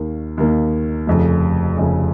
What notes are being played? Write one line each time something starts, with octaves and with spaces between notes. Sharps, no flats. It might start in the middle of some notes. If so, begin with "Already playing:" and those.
Already playing: D#2 D#3 A#3
D#2 D#3 A#3
F1 F2 C#3
F1 F2 C#3